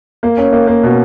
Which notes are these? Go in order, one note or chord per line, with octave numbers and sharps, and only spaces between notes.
A#3
C#4
A#3
A#3
B2